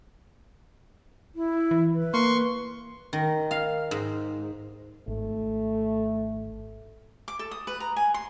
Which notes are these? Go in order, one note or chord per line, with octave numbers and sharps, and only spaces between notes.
E4
E3
B4
A#3 C6 C#6
D#3
F5
G#2
G#1 A3
D6
A4
D#6
B4
A#5
G#5
C6